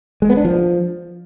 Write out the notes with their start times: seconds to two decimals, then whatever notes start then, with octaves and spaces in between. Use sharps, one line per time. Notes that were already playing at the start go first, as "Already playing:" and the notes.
0.22 G#3
0.30 B3
0.37 D4
0.45 F3